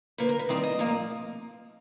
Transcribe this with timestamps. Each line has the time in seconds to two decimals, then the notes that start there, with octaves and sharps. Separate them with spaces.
0.18 D3 F3 A#3 B4
0.29 A#4
0.39 B4
0.49 D#3 G3 C4 D#4 D5
0.63 D#5
0.79 A#2 F3 A#3